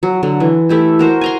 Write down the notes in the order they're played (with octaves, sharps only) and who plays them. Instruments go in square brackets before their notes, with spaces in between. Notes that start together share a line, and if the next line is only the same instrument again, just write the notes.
[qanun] F#3
D3 F#3
E3
A3 E4 G4
F#4 A#4 C5
G#5 A#5 C6